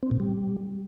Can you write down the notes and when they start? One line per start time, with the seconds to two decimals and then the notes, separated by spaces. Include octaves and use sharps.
0.03 C4
0.11 A#2
0.20 G3